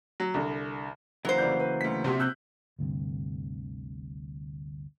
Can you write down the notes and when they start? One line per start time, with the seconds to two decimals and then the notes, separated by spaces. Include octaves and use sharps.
0.20 F#3
0.34 C2 D3
1.25 C#3 E3 F#3 A#3 C5
1.38 F1 D5 G6
1.59 B4
1.81 D2 B6
2.04 A#1 C3 F#4 C6
2.20 E6 F#6 G6
2.79 G1 D2 G2 C3